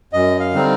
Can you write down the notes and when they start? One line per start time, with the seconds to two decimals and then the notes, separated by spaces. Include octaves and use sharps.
0.13 F#2 D#5
0.40 F5
0.54 D3 G3 C4 D#4